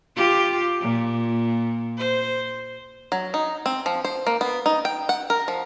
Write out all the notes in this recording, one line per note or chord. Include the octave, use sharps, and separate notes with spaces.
F4 G4
A#2
C5
F#3
D#4
C4
F3
C5
A#3
B3
D#4
G5
F#5
A#4
F3